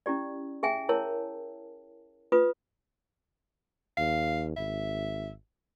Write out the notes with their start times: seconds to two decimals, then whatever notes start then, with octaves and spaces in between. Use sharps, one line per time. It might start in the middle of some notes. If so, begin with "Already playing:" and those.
0.06 C#4 E4 G4 D5
0.63 G#4 E5 G5 G#5
0.89 E4 A#4 C#5 A5
2.32 F4 B4 D#6
3.97 D#2 F5
4.57 G#1 E5